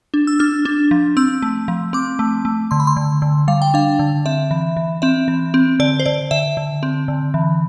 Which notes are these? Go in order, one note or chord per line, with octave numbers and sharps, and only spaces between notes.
D4
E6
D4 F6
D4
F3
C4 E6
A3
F3
C4 D6
A3
A3
D3 C6
B5
C6
D3
D3
G3 F5
G5
D4 F5
D3
C4 E5
E3
E3
C4 E5
E3
C4
D3 D5
C5
D3 D5
D3 E5
D3
C4
D3
E3